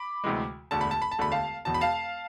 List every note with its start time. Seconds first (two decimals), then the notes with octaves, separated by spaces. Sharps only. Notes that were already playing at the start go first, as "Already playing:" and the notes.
Already playing: B5 D6
0.24 D2 C3 E3 G#3
0.71 E1 D2 D3 A5
0.81 B5
0.91 A5
1.02 B5
1.12 A5
1.19 E1 D2 D3 A3 B5
1.32 F5 A5
1.65 E1 E2 B2 A5
1.74 B5
1.81 F5 A5